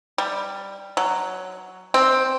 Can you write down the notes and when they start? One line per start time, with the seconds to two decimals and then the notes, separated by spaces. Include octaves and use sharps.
0.18 G3
0.97 F#3
1.94 C4